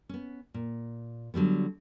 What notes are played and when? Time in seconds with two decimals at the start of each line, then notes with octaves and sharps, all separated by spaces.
0.09 B3 C#4
0.54 A#2
1.34 D3 F#3 G3 B3